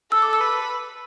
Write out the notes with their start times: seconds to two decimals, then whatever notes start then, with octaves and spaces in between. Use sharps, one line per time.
0.12 A4 E6
0.22 D6
0.33 E6
0.41 B4